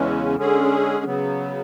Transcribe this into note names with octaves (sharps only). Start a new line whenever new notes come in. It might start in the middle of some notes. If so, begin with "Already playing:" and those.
Already playing: E2 C#3 E3 G#3 C#4
D3 G#3 C#4 G#4
C#3 F#3 B3